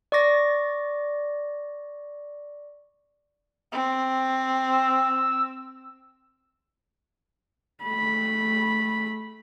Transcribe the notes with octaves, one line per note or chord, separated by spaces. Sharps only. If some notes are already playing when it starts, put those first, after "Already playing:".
D5 C#6 D6 A#6
C4
E6
A3 B5